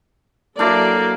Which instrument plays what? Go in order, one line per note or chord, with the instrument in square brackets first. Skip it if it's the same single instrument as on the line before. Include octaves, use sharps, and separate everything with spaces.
[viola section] F#3 A4 D5 [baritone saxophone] A#3 [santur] D4 E4 D6